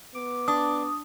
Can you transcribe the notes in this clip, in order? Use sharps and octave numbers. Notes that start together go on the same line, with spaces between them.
B3 D6
D4 D#6